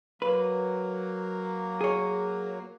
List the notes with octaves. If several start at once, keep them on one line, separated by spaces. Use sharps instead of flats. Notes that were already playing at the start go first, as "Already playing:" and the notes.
F#3 A#3 B4
G#4 C#5